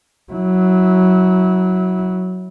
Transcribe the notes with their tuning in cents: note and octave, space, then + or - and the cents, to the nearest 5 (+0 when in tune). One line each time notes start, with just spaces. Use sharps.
F#3 +0 E4 -25